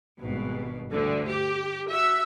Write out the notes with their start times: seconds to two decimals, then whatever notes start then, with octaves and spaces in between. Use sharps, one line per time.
0.21 G#1 G2 B2
0.92 G1 D2 D3
1.29 G4
1.90 F#4 E5 E6